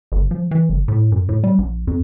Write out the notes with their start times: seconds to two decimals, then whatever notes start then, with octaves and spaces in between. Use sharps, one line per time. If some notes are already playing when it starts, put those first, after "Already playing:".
0.12 G1
0.31 F3
0.51 E3
0.69 G1
0.88 A2
1.12 F#2
1.29 A2
1.44 G3
1.59 A#1
1.87 F2